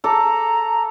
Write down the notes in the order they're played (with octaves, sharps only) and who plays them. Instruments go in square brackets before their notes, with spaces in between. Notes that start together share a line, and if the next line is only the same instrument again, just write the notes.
[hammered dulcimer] A4 A5 D6 [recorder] A#5